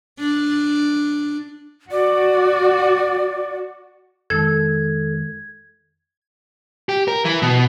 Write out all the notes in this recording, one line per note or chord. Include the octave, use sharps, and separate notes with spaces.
D4
F#4 D5
F2 D#3 G#3 A4 G#6
G4
A#4
E3
B2